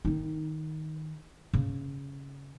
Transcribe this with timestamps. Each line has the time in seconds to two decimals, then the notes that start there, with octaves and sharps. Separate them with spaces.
0.05 D#3 D#4
1.53 C#3